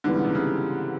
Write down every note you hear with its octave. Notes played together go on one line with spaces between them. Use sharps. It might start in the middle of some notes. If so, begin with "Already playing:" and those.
G#2 D3 E3 G3 B3
C#3
C3
C#3